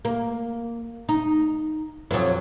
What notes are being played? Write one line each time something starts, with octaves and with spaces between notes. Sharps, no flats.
A#3
D#4
F2 F#3